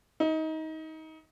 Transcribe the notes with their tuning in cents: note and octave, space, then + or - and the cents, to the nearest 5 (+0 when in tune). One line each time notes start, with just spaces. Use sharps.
D#4 +25